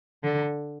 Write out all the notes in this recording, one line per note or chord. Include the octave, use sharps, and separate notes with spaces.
D3